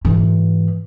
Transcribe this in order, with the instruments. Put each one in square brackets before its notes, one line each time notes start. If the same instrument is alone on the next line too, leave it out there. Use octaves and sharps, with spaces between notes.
[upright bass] G#2 E3